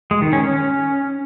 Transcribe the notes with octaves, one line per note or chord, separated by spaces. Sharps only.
G#3
D#3
C#4
C#4